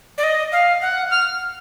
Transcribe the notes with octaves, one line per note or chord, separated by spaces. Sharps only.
D5
D#5
F5
F#5
F6